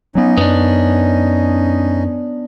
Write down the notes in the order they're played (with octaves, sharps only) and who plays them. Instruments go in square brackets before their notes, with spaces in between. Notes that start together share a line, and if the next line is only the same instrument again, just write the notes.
[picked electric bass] F#3 B3 [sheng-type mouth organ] C#4 D#4
[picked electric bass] F#2 [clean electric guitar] B3 D4